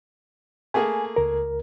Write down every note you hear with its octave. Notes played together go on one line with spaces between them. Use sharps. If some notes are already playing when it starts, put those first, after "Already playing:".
A3 A#3 G#4 G#5
C#2 A#4